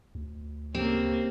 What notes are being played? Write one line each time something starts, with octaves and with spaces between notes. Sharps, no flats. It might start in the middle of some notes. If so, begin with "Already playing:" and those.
D2
C#3 A#3 C4 G4 G5